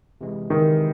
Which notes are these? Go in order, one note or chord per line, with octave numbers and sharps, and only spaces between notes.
C3 E3 G#3
C3 D#3 E3 G#3